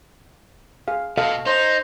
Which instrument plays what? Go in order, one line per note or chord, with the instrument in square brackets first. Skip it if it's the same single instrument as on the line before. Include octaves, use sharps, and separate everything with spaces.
[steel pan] G#4 F5
[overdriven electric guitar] B2 [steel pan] A4 D#5 F5
[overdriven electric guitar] D#4 [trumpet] C5 [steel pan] C#5